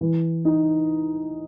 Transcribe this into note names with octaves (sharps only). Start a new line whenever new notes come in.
E3
D#4